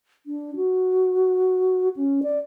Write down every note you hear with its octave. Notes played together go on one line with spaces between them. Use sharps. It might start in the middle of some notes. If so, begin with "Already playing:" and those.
D4
F#4
C#4
D5